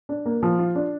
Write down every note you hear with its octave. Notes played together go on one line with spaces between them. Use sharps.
D4
A#3
F3
F4
D4